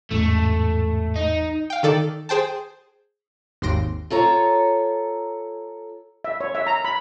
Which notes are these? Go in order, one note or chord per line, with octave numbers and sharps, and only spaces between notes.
A1 E2 G#2 A3
D#4
F5 G5
D#3 A4 D5
G#4 C5 G5 A5
G#1 D#2 C6 A#6 D7
F4 A4 C#5 A#5
E5
C#5
E5
A#5
B5